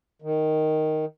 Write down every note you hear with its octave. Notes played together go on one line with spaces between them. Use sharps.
D#3